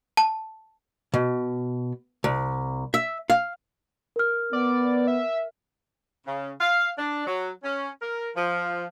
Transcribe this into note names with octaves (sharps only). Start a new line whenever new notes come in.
A5
B2
C2
E5
F5
A#4 F6
B3 D5
E5
C#3
F5
D4
F#3
C#4
A#4
F3